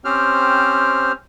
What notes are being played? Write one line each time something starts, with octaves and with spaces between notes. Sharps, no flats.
C4 C#4 G4 C5 F6